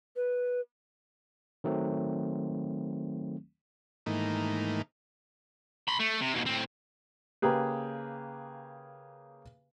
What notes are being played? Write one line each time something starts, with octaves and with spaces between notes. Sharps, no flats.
B4
D#3 F#3 A3 C4
G#2 D#3 E3 A3 A#3 D#4
B5 C6
A3
C3
D#2 B2
A2 C4
C#3 A#3 G4 G#4 B4